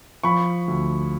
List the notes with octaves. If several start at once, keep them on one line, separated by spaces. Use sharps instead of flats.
F3 B5 C#6
D2